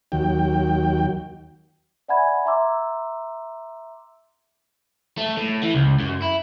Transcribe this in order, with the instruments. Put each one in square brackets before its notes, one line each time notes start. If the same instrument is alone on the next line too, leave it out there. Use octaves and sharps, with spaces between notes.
[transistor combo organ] D#2 F#3 G5
[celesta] D5 E5 F#5 G#5 B5 G#6
E5 A#5 C6 D6 E6
[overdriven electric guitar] A3
A2
E3
C#2
F#2
E4